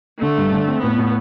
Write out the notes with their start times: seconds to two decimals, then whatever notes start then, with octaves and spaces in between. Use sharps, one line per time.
0.22 D3 A3
0.38 G2
0.52 D3
0.68 C4
0.83 A2 B3
0.98 A2